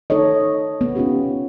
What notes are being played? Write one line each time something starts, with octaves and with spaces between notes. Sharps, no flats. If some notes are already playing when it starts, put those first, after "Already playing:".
D#4 A4 C#5 D#5
B3
C#4 D#4 F4 G4